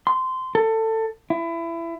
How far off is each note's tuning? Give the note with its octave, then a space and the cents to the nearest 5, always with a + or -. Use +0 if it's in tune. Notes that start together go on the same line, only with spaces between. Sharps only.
C6 -15
A4 +20
E4 +25